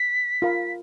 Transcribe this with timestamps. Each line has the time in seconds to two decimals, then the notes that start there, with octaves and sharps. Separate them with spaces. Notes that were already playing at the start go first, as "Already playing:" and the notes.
Already playing: B6
0.42 F4 A#4 F5 B5